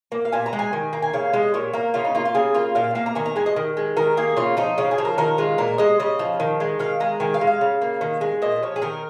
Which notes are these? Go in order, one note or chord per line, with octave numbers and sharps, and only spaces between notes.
A#3
F5
A#2 G#5
A#5
G#3
G#5
D#3
A#3
G#5
C#3 F5
G#3 D#5
A#2 C#5
A#3 A#4
C#3 F4
D#4
A#3 F4
F4
C#3 G#4
A#3 F4
A#2 F5
A#3 F5
A#5
D#3 G#5
A#5
G#3 G#5
D#5
D#3
G#3
D#3 A#4
A#3 G#4
C#3 F4
F3 D#4
C#3 F4
G#4
F3
A#4
D#3 A#4
G#3 F4
A#2 A#4
G#3 D#5
C#3 D#5
F3
D#3
G#3
D#3 F5
G#3 A#5
D#3 G#5
F5
G#3
F5
C#3
A#3
D#3
G#3
A#2 D#5
F3 C#5
G#4
D#3 A#4